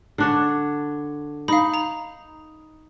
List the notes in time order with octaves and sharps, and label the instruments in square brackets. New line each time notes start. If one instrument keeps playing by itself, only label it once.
[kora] D3 D4 C#5
[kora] D#4 [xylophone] F5 B5
[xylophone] A#5 F7